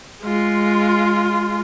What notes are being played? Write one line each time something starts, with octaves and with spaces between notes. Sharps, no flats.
G#3 F4